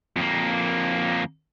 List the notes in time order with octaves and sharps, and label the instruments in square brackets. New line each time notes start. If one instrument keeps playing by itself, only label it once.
[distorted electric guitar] F2 A#3